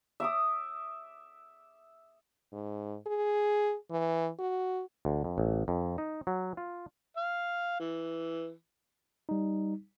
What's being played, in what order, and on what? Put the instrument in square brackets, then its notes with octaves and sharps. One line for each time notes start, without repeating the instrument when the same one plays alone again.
[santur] E5 D6 D#6
[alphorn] G#2
G#4
E3
F#4
[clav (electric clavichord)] D2
F2
A1
F2
D#4
F#3
F4
[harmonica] F5
E3
[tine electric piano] G3 D#4